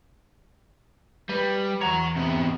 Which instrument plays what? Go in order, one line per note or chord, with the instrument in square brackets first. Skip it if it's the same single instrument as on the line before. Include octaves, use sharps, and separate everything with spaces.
[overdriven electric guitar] G3 [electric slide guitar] B4
[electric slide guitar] E2 A#5 [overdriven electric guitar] C#5 F#5
[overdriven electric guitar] C3 B3